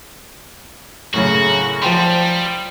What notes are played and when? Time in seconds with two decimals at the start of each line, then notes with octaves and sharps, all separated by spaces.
1.14 F#2 A2 C#3 F#4
1.82 F3 G3 G5 C6